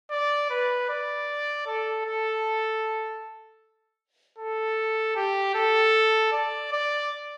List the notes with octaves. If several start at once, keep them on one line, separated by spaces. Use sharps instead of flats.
D5
B4
D5
A4
A4
A4
G4
A4
D5
D5